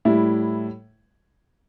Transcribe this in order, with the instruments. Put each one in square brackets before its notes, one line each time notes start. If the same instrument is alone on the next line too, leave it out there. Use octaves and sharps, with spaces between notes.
[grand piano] A2 G3 E4